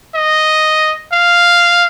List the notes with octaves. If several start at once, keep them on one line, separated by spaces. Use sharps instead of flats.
D#5
F5